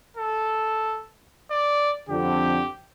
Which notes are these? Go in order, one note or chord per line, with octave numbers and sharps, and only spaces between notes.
A4
D5
F2 D3 G4